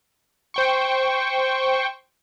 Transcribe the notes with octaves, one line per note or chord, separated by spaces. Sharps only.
C5 G5 C#6